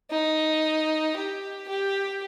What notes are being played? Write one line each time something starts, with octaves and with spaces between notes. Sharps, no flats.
D#4
G4
G4